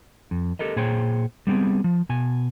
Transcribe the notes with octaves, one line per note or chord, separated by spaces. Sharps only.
F2
G4 A4 A#4 D#5
A#2 G#4 C5 C#5 G5
G3 B3 C4 G#4
F3
B2 G#5